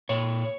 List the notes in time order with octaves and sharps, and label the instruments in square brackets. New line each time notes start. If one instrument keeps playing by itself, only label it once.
[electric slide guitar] A#2 C#5